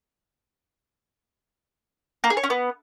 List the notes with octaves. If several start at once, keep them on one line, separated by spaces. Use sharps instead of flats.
A#3
G#4
C#5
C#4
B3